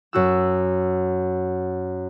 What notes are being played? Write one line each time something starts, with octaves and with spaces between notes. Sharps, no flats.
F#2 F#4 E6